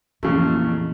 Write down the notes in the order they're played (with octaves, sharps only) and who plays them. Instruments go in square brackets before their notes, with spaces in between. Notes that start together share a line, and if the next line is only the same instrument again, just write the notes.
[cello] F2 A#2 [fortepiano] C#3 A3 [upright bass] E3